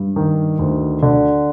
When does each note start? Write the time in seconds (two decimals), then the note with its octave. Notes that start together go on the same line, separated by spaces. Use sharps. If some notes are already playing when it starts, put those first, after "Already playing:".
Already playing: G2
0.16 D#3
0.59 D2
1.02 D3